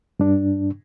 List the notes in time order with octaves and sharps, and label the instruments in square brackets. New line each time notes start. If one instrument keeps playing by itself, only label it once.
[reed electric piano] G2 D4